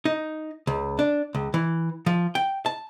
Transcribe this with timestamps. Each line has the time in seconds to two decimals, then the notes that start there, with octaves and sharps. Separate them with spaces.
0.05 D#4
0.67 C#2
0.99 D4
1.35 C#2
1.54 E3
2.06 F3
2.35 G5
2.66 A5